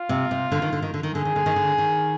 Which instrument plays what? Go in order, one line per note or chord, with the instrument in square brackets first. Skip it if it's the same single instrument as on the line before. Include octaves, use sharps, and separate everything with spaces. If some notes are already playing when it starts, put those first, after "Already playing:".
Already playing: [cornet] F4
[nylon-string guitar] C3
C3
D3
D#3
D3
D#3
D3
D#3
[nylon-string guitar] D3 [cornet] G#4
[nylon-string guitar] D#3
D3
D#3
D3
D#3